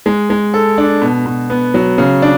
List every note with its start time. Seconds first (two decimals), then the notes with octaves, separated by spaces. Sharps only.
0.06 G#3
0.30 G#3
0.54 A4
0.78 D4
1.02 B2
1.26 B2
1.50 B3
1.74 F#3
1.98 C#3
2.22 D4